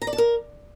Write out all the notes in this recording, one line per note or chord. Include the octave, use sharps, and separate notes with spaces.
A#5
D5
A5
A#4